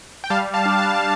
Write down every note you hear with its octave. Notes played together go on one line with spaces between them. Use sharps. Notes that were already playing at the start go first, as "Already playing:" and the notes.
G5
G3 F5 A5
F5 A5
D4
F5 A5